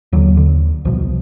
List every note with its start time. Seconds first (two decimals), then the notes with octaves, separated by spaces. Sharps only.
0.13 D#2 D3 F#3
0.37 D3
0.85 C2 B2 F3